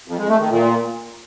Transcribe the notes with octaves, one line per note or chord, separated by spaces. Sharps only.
F2
G#3
A3
D#3
A#2